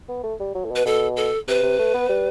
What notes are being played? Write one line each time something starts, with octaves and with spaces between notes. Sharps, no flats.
B3
A3
G3
F#3
A2
B2 B4
B2 A4
A4
C3 B4
C3
A3
B3
G3